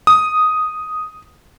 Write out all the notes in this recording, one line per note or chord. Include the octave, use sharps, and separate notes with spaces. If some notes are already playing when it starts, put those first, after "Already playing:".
D#6